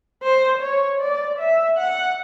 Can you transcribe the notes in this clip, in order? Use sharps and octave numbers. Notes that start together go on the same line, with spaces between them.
C5
C#5
D5
E5
F#5